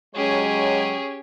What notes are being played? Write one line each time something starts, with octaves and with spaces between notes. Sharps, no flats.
F#3 G#3 C#4 G4 G#4 C#5